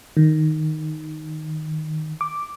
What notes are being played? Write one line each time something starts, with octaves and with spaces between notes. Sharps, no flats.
D#3
D6